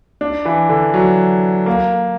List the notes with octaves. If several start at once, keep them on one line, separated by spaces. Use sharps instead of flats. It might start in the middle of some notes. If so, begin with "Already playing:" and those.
D4
E3
D3
F#3
A#3